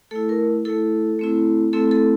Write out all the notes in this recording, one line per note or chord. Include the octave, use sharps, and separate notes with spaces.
A3 E4 A4
A#4
A3 E4 A4
A3 C4 E4
A3 C4 E4 A4
A4